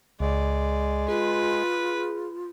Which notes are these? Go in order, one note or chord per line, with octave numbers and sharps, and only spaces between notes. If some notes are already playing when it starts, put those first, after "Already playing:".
C#2 G#3 D5
F4 G#4 B4